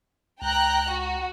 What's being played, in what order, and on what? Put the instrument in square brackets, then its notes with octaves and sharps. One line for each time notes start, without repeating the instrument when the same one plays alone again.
[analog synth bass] C#2 [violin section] G5 A#5 F#6
[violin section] F#4